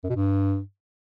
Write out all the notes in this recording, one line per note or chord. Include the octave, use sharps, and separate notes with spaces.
F#2
B2
G2